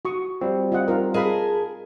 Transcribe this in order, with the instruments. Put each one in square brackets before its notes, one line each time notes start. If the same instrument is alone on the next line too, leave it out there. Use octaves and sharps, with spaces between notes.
[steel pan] F#4 C#6 D#6
[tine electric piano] G3 C4 [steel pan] F4
[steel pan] F4 D#5 F#5
D#4 F4 A#4
[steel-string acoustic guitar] G#4 A#4 A5 [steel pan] D#5 F5 B5